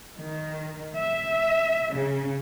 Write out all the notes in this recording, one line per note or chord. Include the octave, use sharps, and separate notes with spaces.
D#3
E5
C#3